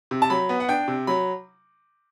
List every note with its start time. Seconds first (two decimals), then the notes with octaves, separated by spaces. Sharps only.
0.11 C3
0.22 A5
0.30 F#3 B5
0.49 B3
0.60 F#5
0.69 D4 G5
0.88 C3
1.07 F#3 B5